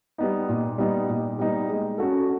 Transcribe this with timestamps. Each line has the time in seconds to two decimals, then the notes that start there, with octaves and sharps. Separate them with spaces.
0.18 G3 B3 D#4
0.49 A#2
0.78 G3 B3 D#4
1.08 A#2
1.39 G3 B3 D#4
1.68 G#3
1.98 C#4 F#4 A4